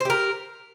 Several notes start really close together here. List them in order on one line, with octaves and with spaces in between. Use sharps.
C5 G4 A#4